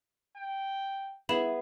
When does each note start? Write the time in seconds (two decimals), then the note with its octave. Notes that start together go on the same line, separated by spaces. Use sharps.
0.37 G5
1.29 B3 E4 G#4 B5 E7